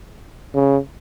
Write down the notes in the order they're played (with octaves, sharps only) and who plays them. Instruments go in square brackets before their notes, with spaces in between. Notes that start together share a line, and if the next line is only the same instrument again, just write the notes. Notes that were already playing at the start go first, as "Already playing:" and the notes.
[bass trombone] C#3